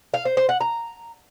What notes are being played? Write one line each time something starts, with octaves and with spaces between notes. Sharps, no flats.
F5
C5
C5
F#5
A#5